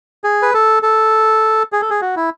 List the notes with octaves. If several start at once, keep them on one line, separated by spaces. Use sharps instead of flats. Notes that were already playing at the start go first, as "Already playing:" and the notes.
G#4
B4
A4
A4
G#4
A4
G#4
F#4
E4